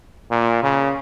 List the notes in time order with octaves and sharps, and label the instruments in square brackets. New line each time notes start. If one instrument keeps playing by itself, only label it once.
[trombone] A#2
C#3